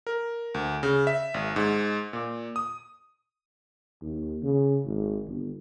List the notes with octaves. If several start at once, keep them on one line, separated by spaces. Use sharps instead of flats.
A#4
D2
C#3
E5
G#1
G#2
A#2
D#6
D#2
C#3
G#1
G1